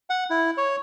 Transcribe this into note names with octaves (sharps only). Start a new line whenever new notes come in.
F#5
E4
C#5